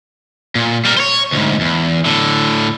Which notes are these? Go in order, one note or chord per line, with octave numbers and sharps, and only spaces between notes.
A#2
G3 A#4
C5 C#5
D2 G#2
E2
A2 D3